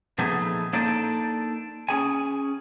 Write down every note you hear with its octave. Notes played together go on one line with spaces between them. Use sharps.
A#2 F3 A3 B3 D#4 G#4
A#3 D4 D#4 A4 C5 D5
C#4 G#4 G#5